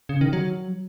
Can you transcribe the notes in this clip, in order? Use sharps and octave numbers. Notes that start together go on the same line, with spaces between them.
C#3
D#3
F#3